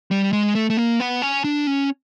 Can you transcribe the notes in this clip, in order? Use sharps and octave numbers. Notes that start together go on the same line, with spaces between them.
G3
G#3
A3
A3
A#3
B3
C#4
D4
C#4